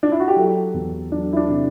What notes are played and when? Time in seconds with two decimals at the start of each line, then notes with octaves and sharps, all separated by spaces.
0.03 D4
0.12 E4
0.20 F#4
0.28 G4
0.36 F#3 A4
0.74 E2
1.11 F#3 D4
1.33 E4
1.37 D4
1.49 C3